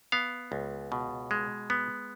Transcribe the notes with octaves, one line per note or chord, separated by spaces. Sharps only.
B3 F5
C#2
B2
G#3
B3